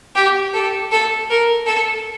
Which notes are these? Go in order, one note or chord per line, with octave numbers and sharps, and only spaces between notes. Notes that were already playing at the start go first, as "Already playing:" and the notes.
G4
A4
A4
A#4
A4